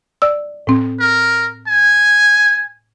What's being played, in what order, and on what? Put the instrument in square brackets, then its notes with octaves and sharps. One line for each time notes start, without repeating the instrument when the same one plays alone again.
[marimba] D5 E6
A2 C4
[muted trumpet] A#4
G#5